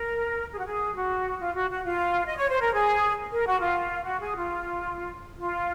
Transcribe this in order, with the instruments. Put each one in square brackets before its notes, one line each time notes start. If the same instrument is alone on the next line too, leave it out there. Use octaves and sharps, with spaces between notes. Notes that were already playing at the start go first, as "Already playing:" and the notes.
Already playing: [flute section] A#4
G#4
F#4
G#4
F#4
F4
F#4
F#4
F4
D#5
C#5
C5
A#4
G#4
A#4
F#4
F4
F#4
G#4
F4
F4